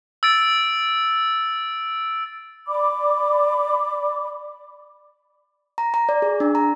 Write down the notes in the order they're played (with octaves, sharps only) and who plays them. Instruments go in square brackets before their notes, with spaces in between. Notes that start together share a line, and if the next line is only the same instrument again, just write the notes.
[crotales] E6 A6 D7
[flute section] D5 B5 D6
[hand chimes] A#5
A#5
D5
G#4
D4
A#5